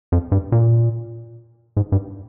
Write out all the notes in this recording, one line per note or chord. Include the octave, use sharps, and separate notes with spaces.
F2
G2
A#2
G#2
G2